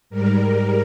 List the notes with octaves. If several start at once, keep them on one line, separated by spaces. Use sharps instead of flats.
G#2 G3 A#4